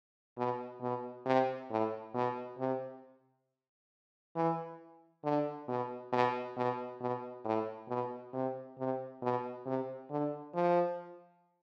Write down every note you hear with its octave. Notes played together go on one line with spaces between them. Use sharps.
B2
B2
C3
A2
B2
C3
E3
D3
B2
B2
B2
B2
A2
B2
C3
C3
B2
C3
D3
F3